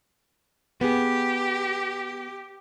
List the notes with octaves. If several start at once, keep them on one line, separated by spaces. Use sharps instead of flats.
B3 G4 G#4